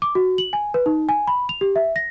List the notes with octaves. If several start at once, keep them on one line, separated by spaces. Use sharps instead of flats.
D6
F#4
F#7
G#5
B4
D#4
G#5
B5
F7
G4
E5
A#6